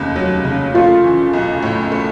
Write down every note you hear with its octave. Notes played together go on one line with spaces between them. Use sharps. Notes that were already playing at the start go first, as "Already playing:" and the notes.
Already playing: F1 D#2 C#3
F#3
C#3
A3 F4
E3
B1
A2
A3